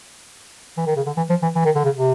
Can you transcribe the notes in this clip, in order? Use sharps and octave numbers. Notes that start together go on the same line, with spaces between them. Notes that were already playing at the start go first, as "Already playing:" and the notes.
E3
D#3
C#3
D3
E3
F3
E3
E3
D#3
D3
C#3
C3